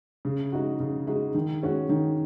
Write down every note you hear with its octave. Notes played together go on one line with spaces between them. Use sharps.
C#3
G#3 D#4 F#4
C#3
G#3 D#4 F#4
D#3
G#3 C#4 F#4
D#3